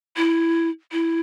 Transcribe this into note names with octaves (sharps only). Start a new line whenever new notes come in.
E4
E4